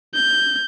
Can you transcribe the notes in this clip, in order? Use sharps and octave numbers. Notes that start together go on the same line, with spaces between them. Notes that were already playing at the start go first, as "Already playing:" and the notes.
G6